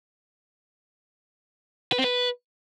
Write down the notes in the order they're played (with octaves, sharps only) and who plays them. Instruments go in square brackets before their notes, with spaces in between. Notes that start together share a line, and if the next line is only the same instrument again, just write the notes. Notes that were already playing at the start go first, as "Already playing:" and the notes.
[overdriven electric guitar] B4
C4
B4